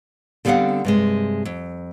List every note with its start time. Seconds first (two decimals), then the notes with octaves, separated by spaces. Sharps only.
0.45 D3 G3 B3 C4 F5 F#5
0.85 G2 C3 G#3
1.45 F2